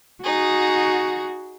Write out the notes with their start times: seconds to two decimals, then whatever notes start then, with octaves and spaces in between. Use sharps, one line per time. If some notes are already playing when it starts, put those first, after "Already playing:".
0.24 D#4 F#4 G#4